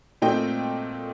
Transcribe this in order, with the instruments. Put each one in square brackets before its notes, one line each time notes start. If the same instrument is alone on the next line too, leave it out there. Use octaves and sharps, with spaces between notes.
[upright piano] A#2 A3 C4 D#5 G5